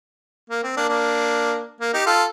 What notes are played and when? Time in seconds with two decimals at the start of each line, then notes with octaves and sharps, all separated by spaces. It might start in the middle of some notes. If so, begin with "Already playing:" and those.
0.50 A#3
0.63 C4
0.77 A#3 D4
0.89 A#3 D4
1.81 A#3
1.94 D#4 G4
2.06 F4 A4